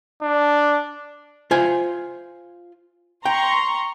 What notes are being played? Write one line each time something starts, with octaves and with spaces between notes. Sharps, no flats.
D4
F4 C5 G#5
G5 A#5 C6 C#6